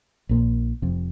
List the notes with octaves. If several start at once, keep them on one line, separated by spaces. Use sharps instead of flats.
A#1 A#2
F1 F2 C3